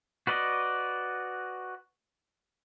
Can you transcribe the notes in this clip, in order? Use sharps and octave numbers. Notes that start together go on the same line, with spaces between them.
F#4 B4 D5 D#5